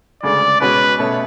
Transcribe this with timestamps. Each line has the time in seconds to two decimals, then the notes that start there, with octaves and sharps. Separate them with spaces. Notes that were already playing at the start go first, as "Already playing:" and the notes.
0.23 D2 C#3 G#3 D5
0.60 B2 G#3 C#4 F#4 B4
0.99 B2 A3 C#4